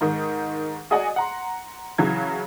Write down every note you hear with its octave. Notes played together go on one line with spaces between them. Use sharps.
G#2 D#3
F#4 G#4 D5 D#5 F#5 G#5
F#5 A#5 C6
C#3 E3 F#3 G#6